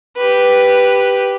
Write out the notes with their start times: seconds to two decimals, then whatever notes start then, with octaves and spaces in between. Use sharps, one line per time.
0.17 G4 B4